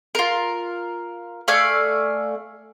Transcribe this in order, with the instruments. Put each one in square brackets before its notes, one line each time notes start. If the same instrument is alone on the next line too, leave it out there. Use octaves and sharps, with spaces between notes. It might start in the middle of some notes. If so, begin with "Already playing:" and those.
[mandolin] F4 A#4
A3 D5 F5 G#5